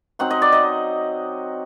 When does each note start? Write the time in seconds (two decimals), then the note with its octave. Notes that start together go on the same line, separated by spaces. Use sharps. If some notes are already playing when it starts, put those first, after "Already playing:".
0.19 F#3 C4 D#4 F#5
0.31 D#5
0.42 D5
0.52 D#5